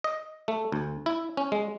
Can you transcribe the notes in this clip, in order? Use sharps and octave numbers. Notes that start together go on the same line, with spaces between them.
D#5
A3
D2
E4
C#4
G#3